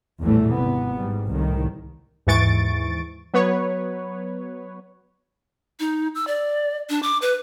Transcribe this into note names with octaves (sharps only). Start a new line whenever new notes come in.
A#1 E2 A2 E3 G3 A3
G#1 C3 B3
G#2 G3
C2 A2 D#3
D#2 G#2 E3 C#6 A6 D7
F#3 B3 B4 C#5
D#4
E6
D5
D4
D6
B4